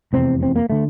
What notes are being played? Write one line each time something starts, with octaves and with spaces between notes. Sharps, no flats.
F1 E2 C3 C4
C4
A#3
D3 A3